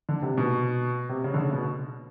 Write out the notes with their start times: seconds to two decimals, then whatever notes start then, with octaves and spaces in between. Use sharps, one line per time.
0.09 D3
0.22 C3
0.38 B2
1.09 C3
1.24 C#3
1.34 D3
1.38 C#3
1.53 B2